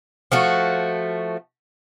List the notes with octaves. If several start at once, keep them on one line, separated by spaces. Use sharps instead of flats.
F3 A3 F#4